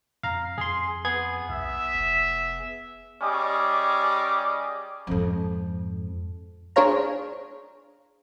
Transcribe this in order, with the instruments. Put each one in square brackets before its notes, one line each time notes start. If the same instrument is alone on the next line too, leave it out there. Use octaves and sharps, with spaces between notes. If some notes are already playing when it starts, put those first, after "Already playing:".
[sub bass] F2 [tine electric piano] F5 A#5
[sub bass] F2 [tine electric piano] G#4 C6
[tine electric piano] B3 G#4 G#6
[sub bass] B1 [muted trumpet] E5
[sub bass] F1
[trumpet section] G3 C#4 G#4 D#5 D6
[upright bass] F2 G#2
[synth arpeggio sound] D4 G#4 C5 C#5 F5 A#5